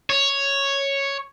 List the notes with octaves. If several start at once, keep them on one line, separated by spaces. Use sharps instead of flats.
C#5